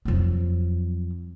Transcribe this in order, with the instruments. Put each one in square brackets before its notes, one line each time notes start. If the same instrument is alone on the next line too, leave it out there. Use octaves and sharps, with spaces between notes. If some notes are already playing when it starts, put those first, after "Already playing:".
[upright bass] F2 F#3